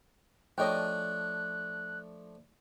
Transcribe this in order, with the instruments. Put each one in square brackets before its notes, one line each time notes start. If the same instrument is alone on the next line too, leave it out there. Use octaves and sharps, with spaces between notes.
[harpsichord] F3 A3 D4 [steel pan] C#5 D#5 G5 [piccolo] F#6